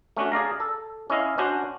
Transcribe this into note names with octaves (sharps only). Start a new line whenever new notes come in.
A3 C#4 D4 F#4
G#4 D5 F5 A#5
A4
C#4 E4 D#5 F5
C#4 D4 F#4 C5